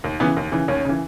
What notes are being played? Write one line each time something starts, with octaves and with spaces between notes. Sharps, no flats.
D#2
C#3 E3 B3
D#2
C#3 E3
D#2 C#4
C#3 E3